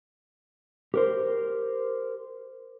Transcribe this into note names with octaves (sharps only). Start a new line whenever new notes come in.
G4 A#4 C5